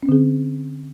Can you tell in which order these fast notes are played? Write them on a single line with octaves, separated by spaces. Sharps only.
C#4 C4 D3 G#4